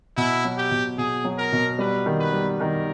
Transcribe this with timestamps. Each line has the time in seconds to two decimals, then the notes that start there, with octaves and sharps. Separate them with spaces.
0.17 B2 E4
0.45 F#3
0.58 G4
0.71 B2
0.98 B2 G#4
1.25 F#3
1.38 A#4
1.53 B2
1.79 G3 B4
2.06 D#3
2.19 B4
2.33 G3
2.60 D#3 A#4